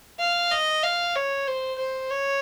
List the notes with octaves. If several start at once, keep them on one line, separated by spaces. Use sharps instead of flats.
F5
D#5
F5
C#5
C5
C5
C#5